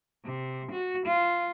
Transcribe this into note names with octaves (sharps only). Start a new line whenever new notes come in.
C3
F#4
F4